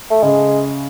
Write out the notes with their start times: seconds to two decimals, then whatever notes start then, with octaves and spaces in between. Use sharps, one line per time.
0.11 A3
0.22 C#3 G#3